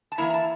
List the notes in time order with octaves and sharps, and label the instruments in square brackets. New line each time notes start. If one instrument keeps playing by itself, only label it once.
[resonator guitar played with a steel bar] A5
E3 A#3 E4 A#5
A#5
A5